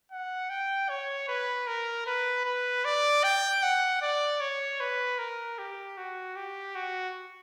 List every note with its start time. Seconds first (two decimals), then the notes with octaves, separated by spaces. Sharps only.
0.12 F#5
0.50 G5
0.89 C#5
1.28 B4
1.67 A#4
2.06 B4
2.45 B4
2.85 D5
3.24 G5
3.63 F#5
4.02 D5
4.40 C#5
4.80 B4
5.19 A#4
5.58 G4
5.97 F#4
6.36 G4
6.75 F#4